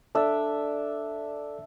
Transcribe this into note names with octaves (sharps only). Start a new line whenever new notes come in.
D4 A4 D5 E5